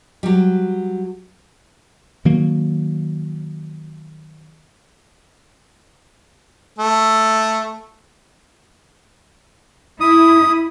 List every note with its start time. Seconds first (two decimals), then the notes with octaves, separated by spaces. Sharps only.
0.23 F#3 G3
2.25 D#3 F#3 A#3
6.79 A3
10.01 E4 D#6